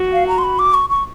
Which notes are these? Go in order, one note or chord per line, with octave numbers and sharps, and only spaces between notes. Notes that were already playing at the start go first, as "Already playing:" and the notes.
Already playing: F#4
F5
A#5
C6
B5
D6
C#6
C#6